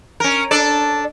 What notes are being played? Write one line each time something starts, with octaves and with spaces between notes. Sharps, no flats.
C#4 A#4
D4 A4 D5